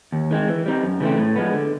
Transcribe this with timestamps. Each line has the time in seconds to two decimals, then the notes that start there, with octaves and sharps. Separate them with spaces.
0.12 D#2
0.31 D#3 G#3 C4
0.48 E3
0.66 G3 C4 D#4
0.84 F#2
1.00 C#3 E3 A3 C4
1.18 A2
1.36 F3 G#3 B3
1.53 D3